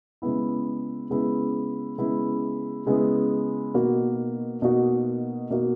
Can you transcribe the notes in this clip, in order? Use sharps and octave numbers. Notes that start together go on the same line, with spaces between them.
C#3 G#3 B3 E4
C#3 G#3 B3 E4
C#3 G#3 B3 E4
C#3 G#3 B3 E4
B2 A#3 D#4 F#4
B2 A#3 D#4 F#4
B2 A#3 D#4 F#4